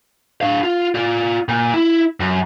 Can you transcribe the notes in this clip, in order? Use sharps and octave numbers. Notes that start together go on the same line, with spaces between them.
D4 F5
F4
F4 D5
A#2
E4
F#2